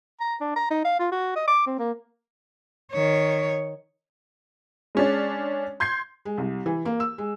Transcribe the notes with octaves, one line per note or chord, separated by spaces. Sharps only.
A#5
D4
A#5
D#4
F5
F4
F#4
D#5
D6
C4
A#3
D#3 C#5
G#3 C#4 D4
C6 G6 G#6 C7
G#3
C2
E3
A#3
E6
G#3